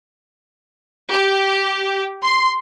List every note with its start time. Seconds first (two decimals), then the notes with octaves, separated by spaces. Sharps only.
1.12 G4
2.23 C6